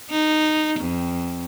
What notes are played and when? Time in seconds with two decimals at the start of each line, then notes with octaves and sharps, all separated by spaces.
0.10 D#4
0.81 F2